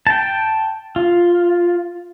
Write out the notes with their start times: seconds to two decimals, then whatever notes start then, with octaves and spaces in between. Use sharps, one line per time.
0.07 G5 A5
0.96 F4